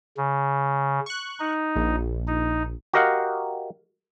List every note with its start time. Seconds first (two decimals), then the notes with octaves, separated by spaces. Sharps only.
0.17 C#3
1.06 C#6 F#6
1.40 D#4
1.76 A#1
2.27 D#4
2.94 F#4 G4 A#4 D#5 F5 F#5